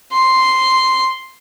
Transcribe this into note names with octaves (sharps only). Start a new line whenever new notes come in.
C6